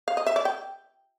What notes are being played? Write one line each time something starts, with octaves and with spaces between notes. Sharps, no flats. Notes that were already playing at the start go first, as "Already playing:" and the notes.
F5
D#5
E5
D5
G5